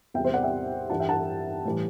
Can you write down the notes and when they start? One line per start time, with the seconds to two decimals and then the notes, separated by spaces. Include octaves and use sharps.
0.14 E2 C3 G3 E5 G5
0.25 C5 E5
0.34 D5 F#5
0.43 E5 G5
0.90 G2 E3 G3 F#5 A5
1.00 E5 G5
1.09 F#5 A5
1.65 A2 E3 G3